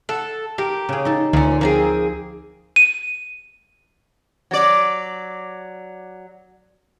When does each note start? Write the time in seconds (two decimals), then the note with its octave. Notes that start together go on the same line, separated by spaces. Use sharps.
0.09 A4 F#5
0.58 G4 A#4
0.89 C#3 G#4
1.05 D#4 A4
1.33 D2 A#2 C#4
1.61 F3 A#3 C4 G#4
2.76 D#7
4.51 F#3 D5